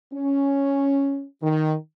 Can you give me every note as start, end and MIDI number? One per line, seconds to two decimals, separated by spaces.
0.13 1.25 61
1.42 1.74 51